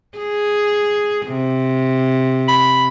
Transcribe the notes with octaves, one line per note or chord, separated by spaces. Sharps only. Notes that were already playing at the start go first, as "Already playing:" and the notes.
G#4
C3
B5